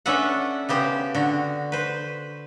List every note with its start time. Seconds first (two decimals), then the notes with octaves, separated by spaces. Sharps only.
0.06 C#4 D4 A4 B4 E5 F#5
0.69 C#3 B3 G4 C5
1.15 D3 F#4
1.72 B4 C5